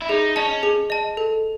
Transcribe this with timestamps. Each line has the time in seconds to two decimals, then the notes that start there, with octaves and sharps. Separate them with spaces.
0.02 E4
0.09 D#4 G#4
0.36 C#4 D#5 A5
0.63 G#4
0.90 D#5 A5
1.17 A4